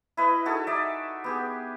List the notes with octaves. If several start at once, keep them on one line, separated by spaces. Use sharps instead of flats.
E4 B4 D#5
D#4 F#4 G#4 A4
D#4 D5 E5
B3 G4 G#4